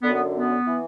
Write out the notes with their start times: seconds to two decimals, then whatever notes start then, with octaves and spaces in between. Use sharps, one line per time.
0.03 D3 B3
0.08 F#2
0.14 B3
0.35 B3
0.67 E3